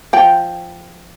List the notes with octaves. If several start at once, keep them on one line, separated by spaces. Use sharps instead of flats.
F3 G5